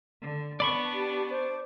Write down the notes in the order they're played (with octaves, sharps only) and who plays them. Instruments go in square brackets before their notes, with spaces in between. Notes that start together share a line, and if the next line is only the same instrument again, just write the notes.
[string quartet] D3
[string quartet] B3 D4 A5 [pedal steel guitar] D5 B5 C#6
[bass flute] G4
C5